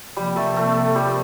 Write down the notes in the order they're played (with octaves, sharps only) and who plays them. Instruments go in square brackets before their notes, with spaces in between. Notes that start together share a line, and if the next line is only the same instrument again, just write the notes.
[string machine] C3 F3 A#3 [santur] G3 G4
[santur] A3 A4
A3 A4
G3 G4